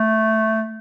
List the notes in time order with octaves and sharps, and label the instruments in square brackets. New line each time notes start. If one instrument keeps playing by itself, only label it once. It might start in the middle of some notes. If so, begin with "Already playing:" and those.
Already playing: [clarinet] A3